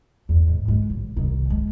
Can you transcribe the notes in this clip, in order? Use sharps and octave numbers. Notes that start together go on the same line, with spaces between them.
E2
G#2
G#3
A1
C2 D#3
G#3